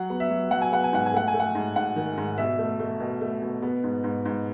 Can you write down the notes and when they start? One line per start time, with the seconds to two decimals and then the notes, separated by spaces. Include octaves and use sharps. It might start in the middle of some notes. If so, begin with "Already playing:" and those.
Already playing: F#3 F#5
0.10 B3
0.20 E5
0.30 F#3
0.51 F#3 F#5
0.62 G#5
0.72 B3 F#5
0.84 G#5
0.93 G#2 F#5
1.06 G#5
1.14 A3 F#5
1.28 G#5
1.34 A3
1.40 F#5
1.55 G#2
1.76 G#2 F#5
1.96 D#3
2.17 G#2
2.38 B2 E5
2.59 A3
2.80 A3
3.00 B2
3.21 A3
3.42 B2
3.62 B3
3.84 G#2
4.04 G#2
4.25 G#2